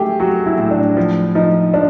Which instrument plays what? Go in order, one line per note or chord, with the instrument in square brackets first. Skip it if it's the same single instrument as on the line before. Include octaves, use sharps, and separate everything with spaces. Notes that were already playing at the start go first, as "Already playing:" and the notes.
Already playing: [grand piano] F#3 A3 [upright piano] G4 G#4
[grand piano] F#3 [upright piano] F#4
[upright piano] E4
[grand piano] A2
[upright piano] D4
[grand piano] F3
[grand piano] F3 [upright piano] D#4
[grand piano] F3 [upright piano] D4